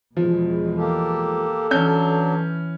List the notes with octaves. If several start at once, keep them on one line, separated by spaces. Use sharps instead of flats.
E2 B2 F3 G#3
A#3 G4 A4
E3 F#3 C#4 D4 G6